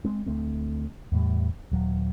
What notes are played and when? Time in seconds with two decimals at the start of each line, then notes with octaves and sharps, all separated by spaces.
0.05 G#3 C4
0.26 D2 A3 C4
1.12 E2 A2 G3
1.71 D#1 F#3